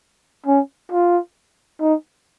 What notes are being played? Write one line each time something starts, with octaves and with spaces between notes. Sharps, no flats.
C#4
F4
D#4